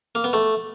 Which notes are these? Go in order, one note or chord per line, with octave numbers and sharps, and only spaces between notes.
A#3
B3
A3